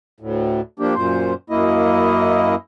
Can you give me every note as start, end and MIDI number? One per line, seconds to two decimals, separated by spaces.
0.20 0.61 38
0.20 0.61 45
0.80 0.94 53
0.80 0.94 58
0.80 0.94 62
0.80 0.94 67
0.94 1.34 42
0.94 1.34 46
0.94 1.34 72
1.50 2.55 42
1.50 2.55 58
1.50 2.55 64
1.50 2.55 75